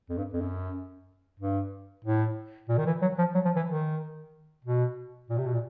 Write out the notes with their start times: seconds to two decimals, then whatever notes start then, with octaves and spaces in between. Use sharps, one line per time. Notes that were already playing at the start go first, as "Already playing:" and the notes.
0.09 F2
0.18 G2
0.33 F2
0.41 F#2
1.40 G2
2.05 A2
2.69 A#2
2.77 D#3
2.86 E3
3.02 F#3
3.18 F3
3.35 F#3
3.45 F3
3.56 E3
3.67 D#3
4.65 B2
5.29 A#2
5.38 C3
5.46 B2
5.54 A#2